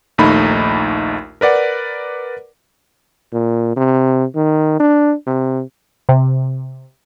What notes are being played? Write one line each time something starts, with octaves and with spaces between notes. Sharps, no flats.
A#1 D#2 A3 D#4 B5
A#4 B4 D5 F#5
A#2
C3
D#3
D4
C3
C3